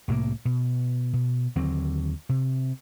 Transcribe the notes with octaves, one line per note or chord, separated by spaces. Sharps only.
C2 A2 C3 A#3
B2
B2
D#2 D3 F#3 C4
C3